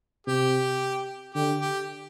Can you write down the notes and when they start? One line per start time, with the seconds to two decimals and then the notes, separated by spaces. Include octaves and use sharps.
0.27 C3 G4
1.35 D3 G4
1.61 G4